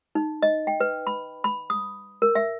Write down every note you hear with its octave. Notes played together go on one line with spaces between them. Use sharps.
D#4
D#5
G5
B4
B5
B5
D#6
A#4
E5